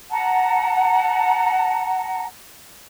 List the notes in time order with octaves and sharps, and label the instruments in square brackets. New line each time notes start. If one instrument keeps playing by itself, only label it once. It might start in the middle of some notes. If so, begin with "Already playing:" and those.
[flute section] F#5 A5 A#5